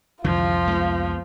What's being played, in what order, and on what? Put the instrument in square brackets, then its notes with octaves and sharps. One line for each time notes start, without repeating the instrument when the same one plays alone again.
[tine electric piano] C2 F2 [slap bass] D3 E3 G#3 [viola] F3 [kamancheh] F4
[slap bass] G#3 A3 B3